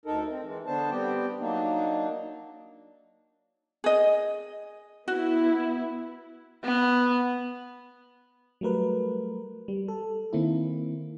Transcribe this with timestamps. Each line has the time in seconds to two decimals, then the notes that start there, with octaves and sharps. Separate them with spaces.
0.05 D2 D#4 A4 A#4
0.30 C4
0.43 E3 G#3
0.66 D3 B3 D4 C5 A5
0.90 G3 B3 C4 G4 G5
1.40 F#3 A#3 D4 D#4
3.84 G#4 D#5
5.08 B3 E4 F#4
6.64 B3
8.61 F#3 G3 A3 A#4 B4
9.68 G3
9.88 A4
10.33 D#3 A#3 C4 E4